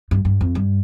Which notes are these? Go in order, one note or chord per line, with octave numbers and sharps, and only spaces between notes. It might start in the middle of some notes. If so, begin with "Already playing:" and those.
G2
G2
F2
G2